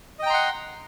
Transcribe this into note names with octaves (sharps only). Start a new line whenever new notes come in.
D#5 F#5 G5 A#5 C6